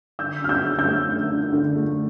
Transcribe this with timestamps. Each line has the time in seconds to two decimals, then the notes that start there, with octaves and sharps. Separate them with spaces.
0.19 D3 E6 G6
0.42 D4 F6
0.49 E6 G6
0.64 D3
0.79 E6 G6
0.86 A3
1.09 D3
1.31 D4
1.53 D3
1.76 A3